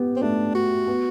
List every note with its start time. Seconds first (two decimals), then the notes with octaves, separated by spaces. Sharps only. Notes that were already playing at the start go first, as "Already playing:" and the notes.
Already playing: B3 G4
0.16 C4
0.22 A3 D4
0.55 F#4
0.87 B3